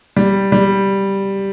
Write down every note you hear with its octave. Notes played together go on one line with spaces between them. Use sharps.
G3
G3